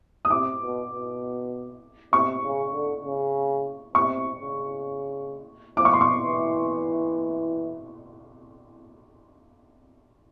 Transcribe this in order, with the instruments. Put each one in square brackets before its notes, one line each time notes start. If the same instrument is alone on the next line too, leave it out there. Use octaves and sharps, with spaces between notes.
[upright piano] D#6
[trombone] C3 [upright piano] D6
[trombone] B2
B2
[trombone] C3 [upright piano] C#6
[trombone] C#3
D3
C#3
[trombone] C3 [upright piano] C#6
[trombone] C#3
[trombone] F3 [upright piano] D6
[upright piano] C#6
C6
C#6
[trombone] E3